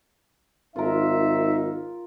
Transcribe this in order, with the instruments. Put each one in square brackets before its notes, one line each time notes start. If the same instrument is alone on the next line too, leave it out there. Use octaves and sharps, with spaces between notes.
[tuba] G#1 [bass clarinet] D#4 [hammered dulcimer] F4 A#4 [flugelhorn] E5